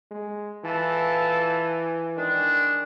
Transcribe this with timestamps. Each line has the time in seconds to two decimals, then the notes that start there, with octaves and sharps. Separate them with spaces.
0.11 G#3
0.65 E3 F4 A4 A5
2.17 D#3 G#3 D4